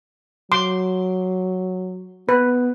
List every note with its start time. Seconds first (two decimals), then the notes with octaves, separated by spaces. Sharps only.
0.52 F#3 C6 D6
2.29 B3 B4